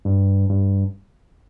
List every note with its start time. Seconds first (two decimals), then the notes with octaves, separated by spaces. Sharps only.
0.05 G2
0.50 G2